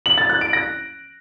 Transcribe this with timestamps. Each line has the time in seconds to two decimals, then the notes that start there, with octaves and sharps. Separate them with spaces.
0.06 F#7
0.18 A6
0.29 F#6
0.41 D7
0.53 A#6